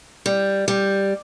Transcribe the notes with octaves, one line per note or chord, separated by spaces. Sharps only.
G3
G3